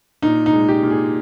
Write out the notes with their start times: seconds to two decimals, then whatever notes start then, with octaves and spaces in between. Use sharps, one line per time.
0.22 A#2 D#4
0.46 D#4
0.53 G#3
0.68 G4
0.83 A#2
0.91 G#4